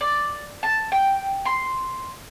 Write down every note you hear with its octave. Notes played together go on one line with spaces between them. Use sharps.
D5
A5
G5
C6